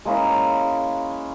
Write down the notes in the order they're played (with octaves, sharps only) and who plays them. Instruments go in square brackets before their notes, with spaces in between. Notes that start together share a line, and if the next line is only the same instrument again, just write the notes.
[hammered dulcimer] G#3 A#3 C#4 E4